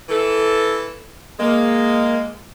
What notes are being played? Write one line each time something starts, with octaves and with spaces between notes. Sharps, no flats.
E3 A4
G#3 A#3